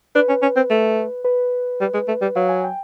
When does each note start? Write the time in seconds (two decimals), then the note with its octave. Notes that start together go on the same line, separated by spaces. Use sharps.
0.15 D4 B4
0.29 C#4
0.42 C#4
0.56 C4
0.70 A3
1.25 B4
1.81 G3
1.94 G#3
2.08 A3
2.22 G3
2.36 F#3 F5
2.49 G#5
2.64 G5